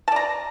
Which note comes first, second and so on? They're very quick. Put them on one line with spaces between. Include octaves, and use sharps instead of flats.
A5 D5 A#5